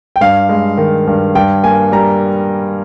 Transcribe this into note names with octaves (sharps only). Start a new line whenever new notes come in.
G5
G2 F5
G#3
D#3
G2
G2 G5
A#3 G#5
G3 A#5